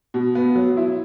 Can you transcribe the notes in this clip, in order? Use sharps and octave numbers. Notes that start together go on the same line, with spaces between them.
B2
B3
F#3
E4